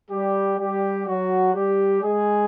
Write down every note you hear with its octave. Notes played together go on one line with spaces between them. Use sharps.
G3 G4
G3 G4
F#3 F#4
G3 G4
G#3 G#4